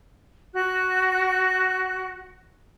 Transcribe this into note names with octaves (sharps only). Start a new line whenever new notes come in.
F#4 F#6